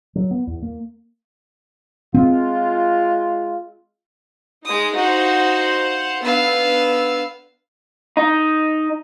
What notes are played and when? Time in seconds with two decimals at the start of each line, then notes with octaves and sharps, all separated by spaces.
0.15 F#3
0.31 B3
0.47 E2
0.62 A#3
2.14 G#3 C4 F4
4.65 G#3 D#4 D#6
4.95 D#4 F#4 C5 F5 F#5
6.23 D3 B3 B4 F5 E6
8.17 D#4